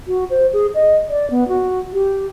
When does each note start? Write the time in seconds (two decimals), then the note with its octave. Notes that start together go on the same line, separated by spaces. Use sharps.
0.07 F#4
0.30 C5
0.53 G#4
0.75 D#5
1.09 D5
1.30 B3
1.48 F#4
1.93 G4